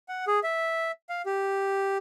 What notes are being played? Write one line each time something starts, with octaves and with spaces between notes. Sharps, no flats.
F#5
G#4
E5
F5
G4